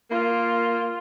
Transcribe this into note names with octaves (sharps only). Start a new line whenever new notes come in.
A#3 F4